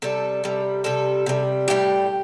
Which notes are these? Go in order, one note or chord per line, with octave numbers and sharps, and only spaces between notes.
C3 G3 A4
C3 G3
C3 G3 A4
C3 G3
A2 E3 G3 G4